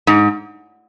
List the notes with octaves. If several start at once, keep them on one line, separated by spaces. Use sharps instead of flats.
G#2